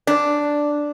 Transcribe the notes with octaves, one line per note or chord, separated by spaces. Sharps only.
D4